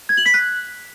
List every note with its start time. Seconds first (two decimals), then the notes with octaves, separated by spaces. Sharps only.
0.09 G#6
0.17 F#7
0.26 B6
0.34 F#6